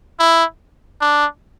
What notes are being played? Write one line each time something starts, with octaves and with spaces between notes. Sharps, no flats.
E4
D4